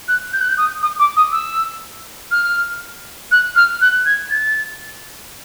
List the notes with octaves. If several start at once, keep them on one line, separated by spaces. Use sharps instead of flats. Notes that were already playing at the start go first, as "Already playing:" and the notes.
F#6
G6
F#6
G6
D#6
D#6
D6
D#6
E6
F6
F#6
F6
F#6
G#6
A6